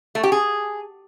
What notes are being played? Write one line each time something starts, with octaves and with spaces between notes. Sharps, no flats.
A3
G4
G#4